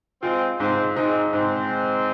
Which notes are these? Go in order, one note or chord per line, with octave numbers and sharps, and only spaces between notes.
G#3 C4 F4
G#2 G#3 C4
G#3 C4 D#4
G#2 G#3 C4